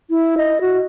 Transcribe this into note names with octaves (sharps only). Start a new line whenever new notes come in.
E4
D#5
F#4